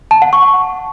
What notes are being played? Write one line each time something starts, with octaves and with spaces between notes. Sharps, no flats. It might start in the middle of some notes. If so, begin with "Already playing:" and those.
A5
F#5
C#6